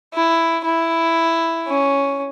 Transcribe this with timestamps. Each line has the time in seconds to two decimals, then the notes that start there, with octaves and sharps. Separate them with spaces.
0.14 E4
0.65 E4
1.67 C#4